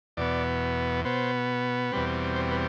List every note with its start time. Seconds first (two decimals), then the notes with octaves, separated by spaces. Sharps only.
0.17 E2 B2 B3 D5
1.05 B2 B3 C5
1.92 E2 B2 G3 C4 B4
2.36 C5
2.51 B4